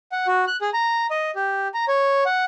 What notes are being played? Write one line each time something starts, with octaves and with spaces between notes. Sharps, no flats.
F#5
F#4
F#6
G#4
A#5
D#5
G4
A#5
C#5
F#5